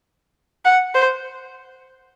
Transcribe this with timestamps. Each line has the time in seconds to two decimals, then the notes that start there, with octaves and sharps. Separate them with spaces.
0.65 F#5
0.95 C5